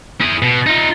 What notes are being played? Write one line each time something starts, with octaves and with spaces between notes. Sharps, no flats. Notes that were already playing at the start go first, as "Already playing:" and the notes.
E4 G#4
B2
D#4 F4